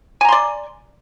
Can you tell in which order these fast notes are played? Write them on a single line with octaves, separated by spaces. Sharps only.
G#5 A#5 C6 D5